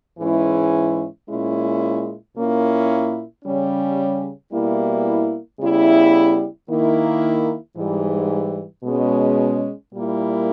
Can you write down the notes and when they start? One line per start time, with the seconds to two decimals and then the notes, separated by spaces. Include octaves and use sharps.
0.19 G#2 E3 G#3 C#4 E4
1.27 A#2 G#3 C#4 E4
2.36 A#2 A#3 C#4 E4
3.43 C#3 G3 C#4
4.51 B2 G3 A#3 E4
5.59 C#3 G3 B3 E4
6.68 D#3 A#3 E4
7.77 G#2 E3 G3
8.84 B2 G#3 C#4
9.93 A#2 G3 A#3 E4